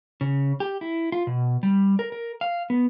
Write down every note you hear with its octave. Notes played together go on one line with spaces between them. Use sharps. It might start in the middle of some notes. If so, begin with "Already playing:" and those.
C#3
G4
E4
F4
B2
G3
A#4
A#4
F5
B3